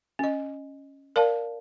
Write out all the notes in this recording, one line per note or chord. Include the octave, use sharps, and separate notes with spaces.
C#4 D#5
A#4 D5 F5 A5